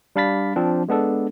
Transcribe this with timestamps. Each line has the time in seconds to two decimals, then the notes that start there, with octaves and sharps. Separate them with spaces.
0.16 G3 D4 F5 B5 A6 B6
0.56 F3 C4 D4
0.88 G#3 B3 D4 A4